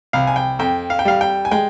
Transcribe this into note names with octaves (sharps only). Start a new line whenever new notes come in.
C2 F5
G#5
G5
F2 G5
F5
G5
G3 F5
G5
G#5
G#3 G5